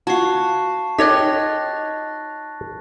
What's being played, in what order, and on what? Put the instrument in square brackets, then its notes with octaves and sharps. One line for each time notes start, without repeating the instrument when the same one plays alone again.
[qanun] F4 F#4 [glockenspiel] A5 C#6 C7
[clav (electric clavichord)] D#4 [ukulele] G4 C#5 D#5 [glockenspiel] F#6 A6 A#6